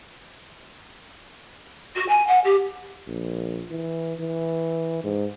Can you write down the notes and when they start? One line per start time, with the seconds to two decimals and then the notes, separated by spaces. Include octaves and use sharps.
1.95 F#4
2.08 G#5
2.27 F#5
2.44 G4
3.08 A#1
3.71 E3
4.20 E3
5.04 G#2